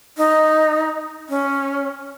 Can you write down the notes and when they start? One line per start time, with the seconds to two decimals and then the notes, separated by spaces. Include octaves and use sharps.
0.17 D#4
1.29 C#4